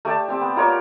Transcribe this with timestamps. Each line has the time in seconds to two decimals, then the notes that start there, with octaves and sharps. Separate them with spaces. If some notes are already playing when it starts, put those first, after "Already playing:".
0.05 A3 G4 D5 A5
0.28 C4 G4
0.41 B3
0.56 F4 A#4 C#5 D5